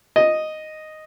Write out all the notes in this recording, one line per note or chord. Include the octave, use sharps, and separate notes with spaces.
D#5